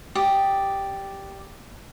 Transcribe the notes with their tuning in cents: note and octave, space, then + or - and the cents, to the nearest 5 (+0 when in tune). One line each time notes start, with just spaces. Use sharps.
G4 +0 D5 +0 D#6 +0